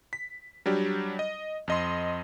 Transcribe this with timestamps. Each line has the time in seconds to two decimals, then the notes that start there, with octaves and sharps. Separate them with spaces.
0.13 B6
0.66 F#3 G3 D4 G4
1.19 D#5
1.68 F2 D#5 C6